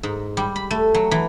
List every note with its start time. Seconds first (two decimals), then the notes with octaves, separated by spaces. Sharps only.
0.03 G#2
0.37 G3
0.56 B5
0.71 A3
0.94 F#3
1.11 E3